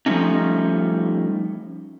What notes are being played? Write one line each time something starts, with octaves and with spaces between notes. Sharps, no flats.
F3 G3 A3 C#4 D#4